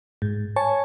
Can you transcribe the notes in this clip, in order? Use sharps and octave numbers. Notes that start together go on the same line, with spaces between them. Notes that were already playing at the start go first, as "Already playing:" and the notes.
G#2
C#5 G#5 A5 C#6